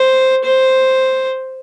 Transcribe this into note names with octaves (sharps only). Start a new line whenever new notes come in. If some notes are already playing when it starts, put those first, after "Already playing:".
Already playing: C5
C5